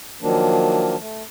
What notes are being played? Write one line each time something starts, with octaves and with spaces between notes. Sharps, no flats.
D#3 F3 F#3 A#3 D4
A3